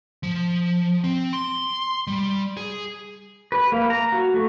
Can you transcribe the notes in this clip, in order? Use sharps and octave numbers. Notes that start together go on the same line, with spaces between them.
F3
C4
C6
G3
G#4
B4
A#3
A#5
F#4
A3